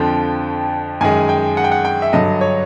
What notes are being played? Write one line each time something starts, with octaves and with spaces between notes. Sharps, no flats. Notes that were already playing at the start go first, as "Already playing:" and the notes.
Already playing: F2 D3 F3 G5
F#2 D#3 G#3 G#5
G5
F#5
G5
F#5
G5
E5
G2 D3 F#3 D#5
C#5